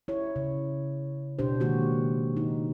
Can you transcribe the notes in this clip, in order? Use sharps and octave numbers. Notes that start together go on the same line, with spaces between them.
E4 C#5
C#3
B2 D4 G4 C5
D#3 G#3 A#3 F#4 G4
D#4